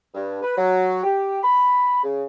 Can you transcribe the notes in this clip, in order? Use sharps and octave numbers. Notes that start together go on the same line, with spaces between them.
G2
B4
F#3
G4
B5
C#3